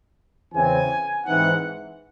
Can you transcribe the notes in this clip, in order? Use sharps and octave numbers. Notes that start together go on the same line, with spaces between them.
E2 C#3 E3 C4 G#5
G#2 E3 C4 D#4 F#5